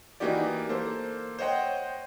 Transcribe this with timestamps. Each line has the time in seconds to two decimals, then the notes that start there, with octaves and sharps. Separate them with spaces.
0.20 E3 A#3 D#4 F#4 G4 D5
0.69 A#3 A4 C5
1.39 C5 C#5 D#5 F#5 G5